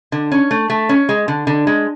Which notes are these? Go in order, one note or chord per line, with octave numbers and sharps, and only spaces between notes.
D3
C#4
A3
A3
C#4
G#3
D3
D3
G#3